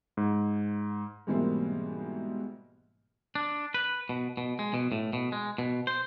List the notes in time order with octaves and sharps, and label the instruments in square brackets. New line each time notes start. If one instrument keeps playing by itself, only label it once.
[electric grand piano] G#2
[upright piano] G#2 B2 E3 G3 A#3 C4
[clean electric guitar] D4
B4
B2
B2
G#3
B2
A2
B2
G#3
B2
C5